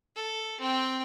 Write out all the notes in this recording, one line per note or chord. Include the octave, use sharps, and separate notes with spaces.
A4
C4 G5